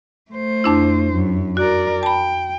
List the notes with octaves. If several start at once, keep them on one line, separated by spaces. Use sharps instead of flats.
A3 C5
F2 D4 E4
F#2
F#4 A#4 D5
G5 A5 B5